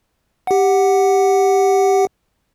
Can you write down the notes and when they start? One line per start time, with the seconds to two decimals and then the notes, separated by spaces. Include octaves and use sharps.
0.47 G4 F#5